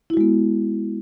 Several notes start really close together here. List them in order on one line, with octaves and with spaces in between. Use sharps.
E4 F#4 G#3 B3